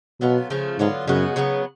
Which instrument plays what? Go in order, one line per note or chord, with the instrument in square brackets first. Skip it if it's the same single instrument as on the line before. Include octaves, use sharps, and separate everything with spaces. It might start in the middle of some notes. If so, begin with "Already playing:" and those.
[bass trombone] B2 [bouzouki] F#3 B3 F4 A4
[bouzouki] C#3 F3 A3 F4
[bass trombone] G#2 [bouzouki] D3 F#3 B3 F4
[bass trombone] F#2 [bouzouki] C#3 G#3 B3 F#4
[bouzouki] C#3 F#3 B3